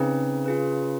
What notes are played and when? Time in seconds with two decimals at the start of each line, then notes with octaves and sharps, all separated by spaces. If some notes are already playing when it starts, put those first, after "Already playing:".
Already playing: C#3 C4 D#4 G#4 B4
0.46 F4 G#4 B4